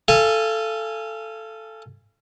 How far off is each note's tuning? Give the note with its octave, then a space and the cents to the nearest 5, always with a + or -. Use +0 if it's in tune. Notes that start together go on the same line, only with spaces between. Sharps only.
A4 +0 F5 -30 G#5 -5